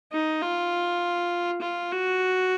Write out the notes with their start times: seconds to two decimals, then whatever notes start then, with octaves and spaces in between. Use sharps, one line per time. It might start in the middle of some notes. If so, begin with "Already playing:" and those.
0.13 D#4
0.42 F4
1.62 F4
1.92 F#4